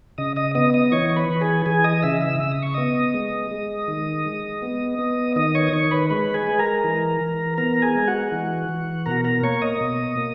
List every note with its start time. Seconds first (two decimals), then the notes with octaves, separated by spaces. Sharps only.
0.18 C#3 D#5 D#6
0.36 D#5 D#6
0.55 B3 D#5 D#6
0.74 D#5 D#6
0.92 E3 C#5 C#6
1.09 C#6
1.16 B4 B5
1.30 E3
1.41 G#4 G#5
1.66 E3 G#4 G#5
1.84 D#5 D#6
2.03 C#3 E5 E6
2.21 E5 E6
2.40 C#3 E6
2.51 D#6
2.62 C#6
2.74 B3 D#5 D#6
3.14 G#3
3.51 G#3
3.88 D#3
4.25 G#3
4.62 B3
4.99 B3
5.36 D#3 D#5 D#6
5.55 C#5 C#6
5.67 D#6
5.73 D#3 C#5 C#6
5.91 B4 B5
6.10 G#3 B4 B5
6.34 G#4 G#5
6.47 G#3
6.59 A#4 A#5
6.84 E3
7.21 E3
7.58 B3 A#4 A#5
7.82 G#4 G#5
7.95 G#3
8.08 F#4 F#5
8.32 E3
8.69 E3
9.06 B2 A#4 A#5
9.24 A#4 A#5
9.43 A#3 C#5 C#6
9.62 D#5 D#6
9.81 B2
10.17 A#3